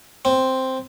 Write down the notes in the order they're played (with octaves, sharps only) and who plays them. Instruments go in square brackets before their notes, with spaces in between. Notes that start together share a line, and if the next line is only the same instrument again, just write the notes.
[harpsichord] C4